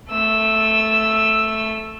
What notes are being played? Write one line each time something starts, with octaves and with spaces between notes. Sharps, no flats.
A3 E6